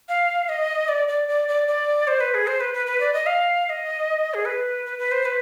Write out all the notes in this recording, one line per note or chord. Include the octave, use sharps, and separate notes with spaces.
F5
D#5
D5
D5
D5
D5
D5
C5
B4
G#4
C5
B4
B4
B4
D5
D#5
F5
F5
D#5
G#4
B4
B4
B4
C5
B4